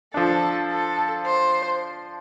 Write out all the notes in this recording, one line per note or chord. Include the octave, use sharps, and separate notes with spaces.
F3 D4 A4
A4
C5